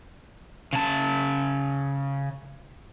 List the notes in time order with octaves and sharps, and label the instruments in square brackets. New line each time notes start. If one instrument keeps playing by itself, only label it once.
[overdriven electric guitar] C#3 A5